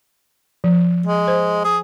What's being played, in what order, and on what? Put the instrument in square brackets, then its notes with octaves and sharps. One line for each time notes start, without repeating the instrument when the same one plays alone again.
[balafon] F3
[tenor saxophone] G#3
[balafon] C5
[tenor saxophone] G#4